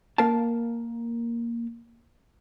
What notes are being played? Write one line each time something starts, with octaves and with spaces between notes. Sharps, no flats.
A#3 A#4 F5 G5 A5